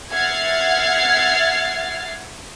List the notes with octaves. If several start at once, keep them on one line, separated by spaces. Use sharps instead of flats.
E5 F#5 F6 G#6 A6 C7